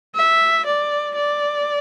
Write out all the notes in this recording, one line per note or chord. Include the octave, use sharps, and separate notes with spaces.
E5
D5
D5